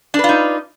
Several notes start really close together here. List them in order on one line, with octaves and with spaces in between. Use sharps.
D4 B4 F4 D#4